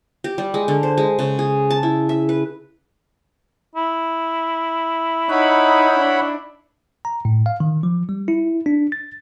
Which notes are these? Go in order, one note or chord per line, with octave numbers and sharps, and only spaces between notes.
G4
G3
G#3
D3
C5
G#3
C#3
G#4
A5
E4
E5
B4
E4
D#4 C#5 F#5 B5
D4
A#5
A2
F5
D#3
F3
G3
E4
D4
A6